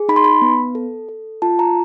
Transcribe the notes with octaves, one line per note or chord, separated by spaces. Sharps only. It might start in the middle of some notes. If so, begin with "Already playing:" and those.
Already playing: G#4
D#4 B5
C6
B5
B3
A4
A4
F4 A5
A#5